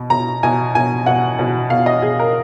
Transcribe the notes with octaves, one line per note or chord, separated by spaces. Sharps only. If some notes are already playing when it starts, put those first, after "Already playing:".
Already playing: B2
B2 A#5
B2 G#5
B2 G#5
B2 F#5
B2
B2 F5
D#5
B2 G#4
A#4